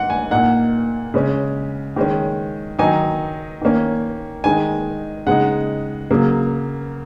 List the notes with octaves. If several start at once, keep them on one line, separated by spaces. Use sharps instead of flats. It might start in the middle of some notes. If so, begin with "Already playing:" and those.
Already playing: G#2 D#3 F#5
G#5
A#2 A#3 D#4 F#5
C#3 G#3 C#4
D#3 G#3 C#4
D#3 F#3 D#4 G#5
D#3 A#3 C#4
D#3 G#3 D#4 G#5
C#3 G#3 D#4 F#5
C#3 F#3 A#3